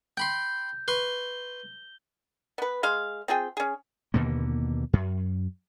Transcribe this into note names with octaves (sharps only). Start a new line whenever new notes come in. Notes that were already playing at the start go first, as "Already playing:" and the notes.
G5 B5 C6 G6
B4 C6 C#6 G7
B3 B4
G#3 F5 C6
C4 F4 G#4 G5
C#4 G#4
D#2 B2 D3 A#3
F#2